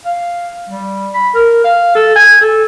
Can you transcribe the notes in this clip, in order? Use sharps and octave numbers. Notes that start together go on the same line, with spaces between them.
F5
G3
B5
A#4
F5
A4
G#5
A4